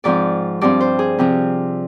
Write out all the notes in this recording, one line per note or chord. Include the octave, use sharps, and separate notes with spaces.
G#2 F3 C4 D5
G2 F3 C4 D5
C5
G#4
C3 F3 C4